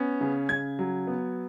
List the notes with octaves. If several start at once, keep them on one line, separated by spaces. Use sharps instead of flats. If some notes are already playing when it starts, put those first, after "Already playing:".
Already playing: B3 C#4
C#3
C#3 G#6
F#3
B3